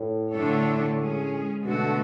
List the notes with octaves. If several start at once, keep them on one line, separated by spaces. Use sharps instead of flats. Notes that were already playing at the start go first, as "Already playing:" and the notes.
Already playing: A2
D3 A3 D4 A4 C#5
G#3 C#4 G#4
B2 D3 A3 D4 F#4 A4